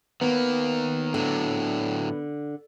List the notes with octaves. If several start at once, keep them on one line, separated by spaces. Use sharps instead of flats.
D#3 A#3 B3
A2 D3 F#3